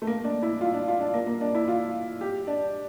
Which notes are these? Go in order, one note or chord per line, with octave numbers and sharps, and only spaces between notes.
A3
A#3
D4
E4
F4
D4
F4
D4
A#3
A#3
D4
E4
F4
G4
D4